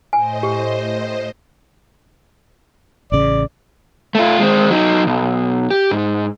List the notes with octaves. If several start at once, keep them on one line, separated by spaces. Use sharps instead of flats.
A2 C5 D#5 G#5
G4
A1 C#3 D5
A3 F4
G#3 C4
F#3 D#4
B1
G4
G#2